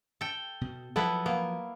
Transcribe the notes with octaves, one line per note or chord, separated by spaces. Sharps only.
A4 G5
B2
F3 F#3 B3 E4 A4 B4
A#3 B3